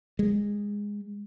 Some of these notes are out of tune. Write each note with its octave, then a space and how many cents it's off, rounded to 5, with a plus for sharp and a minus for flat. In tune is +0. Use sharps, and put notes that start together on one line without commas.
G#3 -15